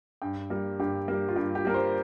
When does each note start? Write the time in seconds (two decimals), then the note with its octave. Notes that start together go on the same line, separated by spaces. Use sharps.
0.22 G2 G5
0.50 G3 A#3
0.80 G2 G4
1.08 G3 A#3
1.28 F4
1.36 G2 G4
1.55 G4
1.65 G3 A#3 A#4
1.74 C5